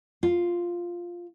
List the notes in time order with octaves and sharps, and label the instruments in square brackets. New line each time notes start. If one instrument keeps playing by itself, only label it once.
[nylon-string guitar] F4